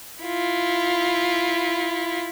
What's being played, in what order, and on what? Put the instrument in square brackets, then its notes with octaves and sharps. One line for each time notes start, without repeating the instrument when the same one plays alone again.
[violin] E4 F4